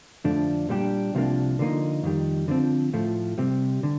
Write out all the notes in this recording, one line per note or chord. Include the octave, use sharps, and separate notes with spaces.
F2 D3 F3 A3 D4
A#2 G3 D4 G4
C2 C3 F3 A#3 D4
D3 F3 A#3 D#4
F2 D#3 G3
D3 F3 C4
A2 F3 A3
C3 G3 C4
D3